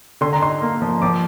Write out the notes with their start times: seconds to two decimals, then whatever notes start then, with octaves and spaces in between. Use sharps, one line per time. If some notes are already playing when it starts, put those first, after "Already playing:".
0.21 D3 C6
0.33 A#5
0.41 D#4 C6
0.62 A#3
0.82 F3
1.02 F3 D6